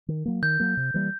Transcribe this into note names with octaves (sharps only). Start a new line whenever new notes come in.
D#3
F#3 A#3
D#3 G6
F#3 A#3
C3
E3 G3 A#3